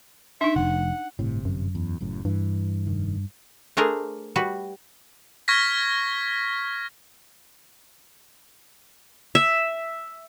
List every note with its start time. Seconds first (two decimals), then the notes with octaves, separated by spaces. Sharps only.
0.41 D4 D#4 E5
0.56 F1 F#5
1.19 G1 A2 C3
1.45 F#2
1.75 E2
2.01 F#1 F#2 A2
2.25 G2 E3
2.87 F1 D#3
3.77 A3 D4 G#4 A#4 C5
4.36 G3 F#4 B4
5.48 C#6 F6 G#6 A#6 B6
9.35 E5